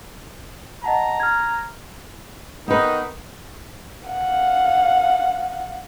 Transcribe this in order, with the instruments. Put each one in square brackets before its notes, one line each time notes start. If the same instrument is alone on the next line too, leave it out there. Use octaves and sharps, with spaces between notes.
[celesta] D#5 F#5 A5 [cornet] A#5
[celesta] F6 G#6
[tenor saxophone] D#3 [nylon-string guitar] B3 B4 [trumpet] D#4
[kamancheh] F5 F#5